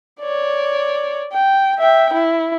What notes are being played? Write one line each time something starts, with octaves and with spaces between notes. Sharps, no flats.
C#5 D5
G5
E5 G5
E4